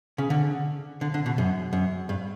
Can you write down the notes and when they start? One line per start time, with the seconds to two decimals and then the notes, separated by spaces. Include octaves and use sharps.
0.18 C#3
0.30 D3
1.01 D3
1.14 D3
1.26 B2
1.38 F#2
1.73 F#2
2.09 G2